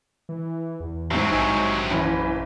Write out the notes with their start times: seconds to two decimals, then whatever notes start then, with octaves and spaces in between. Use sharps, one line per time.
0.29 E3
0.80 E2
1.11 C2 G#2 F#3 C4
1.32 A#1 D#4 G#5
1.90 F#1 E3 C#4 B5